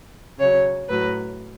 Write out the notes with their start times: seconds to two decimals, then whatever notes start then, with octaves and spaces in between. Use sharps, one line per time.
0.38 C#3 F#3 C#5
0.89 A2 F#3 B4